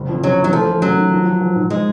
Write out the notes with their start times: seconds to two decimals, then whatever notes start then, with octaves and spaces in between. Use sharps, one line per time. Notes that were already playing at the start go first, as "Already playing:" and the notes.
Already playing: F#1
0.09 F2
0.23 C#3 F#3
0.38 E3
0.44 F#3
0.52 F3 A3
0.67 A3
0.82 F#2 F#3
0.97 D#3
1.11 F3
1.26 F3
1.41 F3
1.56 G#2
1.70 G#3